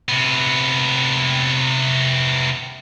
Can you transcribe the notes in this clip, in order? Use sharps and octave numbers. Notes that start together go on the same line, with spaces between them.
C3 B3